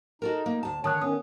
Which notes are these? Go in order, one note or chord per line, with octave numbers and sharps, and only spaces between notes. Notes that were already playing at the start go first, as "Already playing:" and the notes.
D#4 F#4 A4 A#4
A#3
D2 A5
D3 D#3 C#5 A5 D#6 F#6
D#3 B3 C#4 D#6